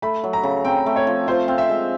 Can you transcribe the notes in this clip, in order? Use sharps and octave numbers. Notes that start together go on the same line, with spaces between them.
A3 B5
F#3
A#5
C#3
C4 G5
A3
C#5
F3
F4 C5
C4 F5
E5
G#3